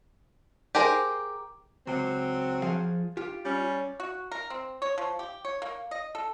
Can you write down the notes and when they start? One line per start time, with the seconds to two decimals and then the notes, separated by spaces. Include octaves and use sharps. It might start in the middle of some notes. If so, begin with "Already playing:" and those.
0.75 G4 G#4 A#4 C5
1.87 C#2 F#3 C4
2.62 F3 G#4 F5
3.17 F4 G4
3.45 G3 C#4
4.00 F#4
4.32 A#4
4.50 C4
4.82 C#5
4.98 F3
5.19 G4
5.45 C#5
5.62 A#3
5.91 D#5
6.15 A4